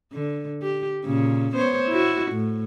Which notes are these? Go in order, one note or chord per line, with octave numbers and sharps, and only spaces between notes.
D3
G4
A#2 C#3
B3 C5 C#5
E4 F#4
A2